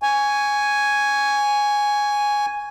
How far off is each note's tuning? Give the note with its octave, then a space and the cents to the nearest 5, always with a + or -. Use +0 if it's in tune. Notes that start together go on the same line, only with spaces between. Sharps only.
G#5 +0 C#6 +20